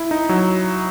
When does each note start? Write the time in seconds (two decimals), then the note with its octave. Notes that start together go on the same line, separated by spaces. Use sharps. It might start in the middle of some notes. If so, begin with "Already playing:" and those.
Already playing: E4
0.11 D#4
0.29 F#3